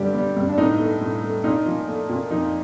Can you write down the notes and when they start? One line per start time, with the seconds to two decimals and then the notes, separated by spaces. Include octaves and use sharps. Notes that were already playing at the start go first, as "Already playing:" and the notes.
Already playing: G2 D3 G3 G4
0.14 G3
0.37 G2
0.49 D4
0.58 A2 D#4
0.79 A3
1.01 A2
1.22 A3
1.44 A#2 D#4
1.66 F3
1.88 A3
2.09 A#2
2.31 F2 D#4